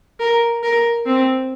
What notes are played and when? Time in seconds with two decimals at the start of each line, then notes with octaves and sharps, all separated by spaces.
0.20 A#4
0.63 A#4
1.06 C4